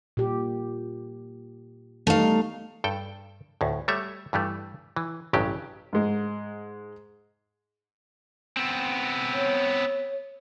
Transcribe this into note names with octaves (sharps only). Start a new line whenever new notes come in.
A#2 G4
G3 A3 D#4 F5
G2 A4 G5
D2 A2
G3 A3 C#5 E5
G2 E3 G3 A3
E3
A1 G2 C#3 F#3 G4
G#2 G#3
B3 C4
C#5